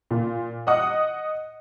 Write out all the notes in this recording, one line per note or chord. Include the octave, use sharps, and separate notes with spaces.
A#2
D#5 F#5 D#6